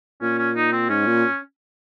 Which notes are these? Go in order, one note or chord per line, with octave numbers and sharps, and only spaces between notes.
A#2 C#4
C#4
D#4
C4
G#2 C#4
A#2